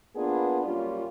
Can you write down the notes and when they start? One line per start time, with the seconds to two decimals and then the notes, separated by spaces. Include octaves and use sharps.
0.15 A#3 B3 D4 F4 G#4 B4
0.64 F#2 G3 A#3 C#4 F4